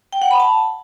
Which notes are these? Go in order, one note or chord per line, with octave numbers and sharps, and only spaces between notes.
G5
F#5
B5
A5